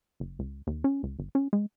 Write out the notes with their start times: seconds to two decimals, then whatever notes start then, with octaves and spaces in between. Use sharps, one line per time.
0.20 F#1
0.39 C#2
0.67 D#2
0.84 C#4
1.03 C#2
1.19 G1
1.35 C#4
1.53 G#3